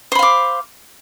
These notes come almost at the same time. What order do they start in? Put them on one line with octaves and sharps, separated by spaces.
C5 B5 F5 D6